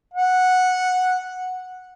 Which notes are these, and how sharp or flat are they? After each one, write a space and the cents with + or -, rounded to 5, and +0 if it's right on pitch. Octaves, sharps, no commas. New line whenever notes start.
F#5 -10